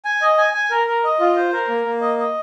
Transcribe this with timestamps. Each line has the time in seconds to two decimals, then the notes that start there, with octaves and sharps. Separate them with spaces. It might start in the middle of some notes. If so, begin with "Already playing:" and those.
0.05 G#5
0.22 D#5
0.38 G#5
0.54 G#5
0.71 A#4
0.87 A#4
1.04 D#5
1.20 F4
1.36 C5
1.53 A#4
1.68 A#3
1.86 A#3
2.01 D#5
2.18 D#5